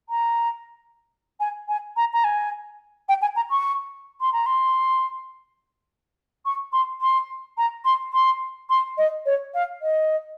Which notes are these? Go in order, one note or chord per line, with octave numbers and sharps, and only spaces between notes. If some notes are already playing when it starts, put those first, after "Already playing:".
A#5
G#5
G#5
A#5
A#5
G#5
G5
G#5
A#5
C#6
C6
A#5
C6
C#6
C6
C6
A#5
C6
C6
C6
D#5
C#5
F5
D#5